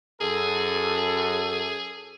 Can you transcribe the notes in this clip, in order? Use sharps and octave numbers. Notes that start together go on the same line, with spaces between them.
F#2 G#4 A4